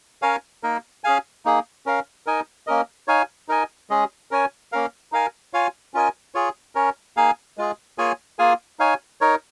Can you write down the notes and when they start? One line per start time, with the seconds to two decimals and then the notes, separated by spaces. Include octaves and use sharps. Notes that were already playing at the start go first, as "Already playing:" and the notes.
0.22 C#4 A#4 C#5 F5 G#5
0.63 A#3 D#4 A#4
1.04 C#4 G#4 F5 G#5
1.45 A#3 D#4 G#4
1.86 C#4 A#4 F5
2.26 D#4 A#4 D#5 G#5
2.67 A#3 C#4 A#4 D#5
3.08 D#4 C#5 F5 G#5
3.48 D#4 A#4 D#5 G#5
3.90 G#3 C#4 G#4 D#5
4.31 C#4 A#4 C#5 G#5
4.72 A#3 C#4 A#4 F5
5.12 D#4 A#4 F5 G#5
5.53 F4 C#5 F5 G#5
5.94 C#4 F4 A#4 D#5 G#5
6.34 F4 G#4 C#5
6.75 C#4 A#4 C#5
7.17 A#3 D#4 G#4 F5 G#5
7.58 G#3 F4 G#4
7.98 A#3 F4 G#4 C#5 G#5
8.39 A#3 F4 G#4 F5 G#5
8.79 D#4 C#5 F5 G#5
9.21 D#4 A#4 C#5